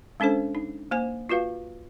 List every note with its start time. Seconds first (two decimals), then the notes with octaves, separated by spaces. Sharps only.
0.20 G#3 C#4 D4 A4 C5
0.55 D#4
0.91 A#3 C5 G#5
1.29 F4 F#4 B4 F5